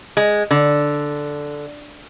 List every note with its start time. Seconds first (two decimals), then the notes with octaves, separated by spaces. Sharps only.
0.17 G#3
0.51 D3